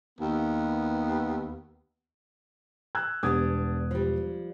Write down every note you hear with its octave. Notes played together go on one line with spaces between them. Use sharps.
D#2 B3
E6 F#6 G#6
E1 G3 B3 D4 D#6 G#6
F3 G3